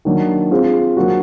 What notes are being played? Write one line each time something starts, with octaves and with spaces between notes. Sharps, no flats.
D#3 F#3 A#3 D4
G#3 C4 F4 G#4
F#3 A#3 D4 F#4